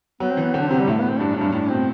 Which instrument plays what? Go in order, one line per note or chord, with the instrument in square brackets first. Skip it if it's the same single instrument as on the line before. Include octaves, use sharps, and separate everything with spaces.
[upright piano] F#3 [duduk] B3
[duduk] C4
[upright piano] E3
[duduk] B3
[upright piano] D3 [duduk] C4
[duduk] D4
[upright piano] C3 [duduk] C4
[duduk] G3
[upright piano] A2 [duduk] A3
[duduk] B3
C4
[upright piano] G2 [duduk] D4
[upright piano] F#2
[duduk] D4
[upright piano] G2
[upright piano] A2 [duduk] D4
[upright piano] B2 [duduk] C4